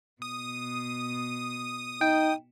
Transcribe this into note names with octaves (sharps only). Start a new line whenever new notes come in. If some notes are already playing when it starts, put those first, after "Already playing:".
B2 D#6
D#4 G5